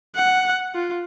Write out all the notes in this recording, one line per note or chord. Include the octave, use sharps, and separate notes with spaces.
F#5
F4